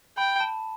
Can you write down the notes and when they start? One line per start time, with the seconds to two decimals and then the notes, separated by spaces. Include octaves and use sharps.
0.18 G5 B5
0.40 A5